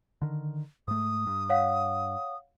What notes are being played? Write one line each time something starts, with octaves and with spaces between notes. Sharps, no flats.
D3 D#3
G#2 A3 D#6
G2
C#5 F5 F#5